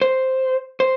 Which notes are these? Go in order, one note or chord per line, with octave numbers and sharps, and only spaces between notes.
C5
C5